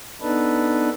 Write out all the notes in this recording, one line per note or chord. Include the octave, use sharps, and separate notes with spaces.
B3 D4 D#4 A4 B4